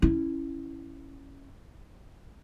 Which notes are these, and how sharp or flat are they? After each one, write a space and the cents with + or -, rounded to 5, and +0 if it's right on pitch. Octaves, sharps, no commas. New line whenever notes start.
C#4 -10 E4 +0